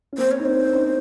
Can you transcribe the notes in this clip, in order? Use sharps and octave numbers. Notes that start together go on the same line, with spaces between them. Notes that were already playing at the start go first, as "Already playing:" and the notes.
C#4
A#3 C4 C5
C#5
D#4
C4 D4 C5
C#4 D#4